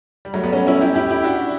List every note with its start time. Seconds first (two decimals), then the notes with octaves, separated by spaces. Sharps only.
0.25 G3
0.34 F#3 A3
0.43 G3 B3
0.53 A3 C#4
0.67 C#4 E4
0.81 E4 G4
0.95 E4 G4
1.10 E4 G4
1.24 D4 F#4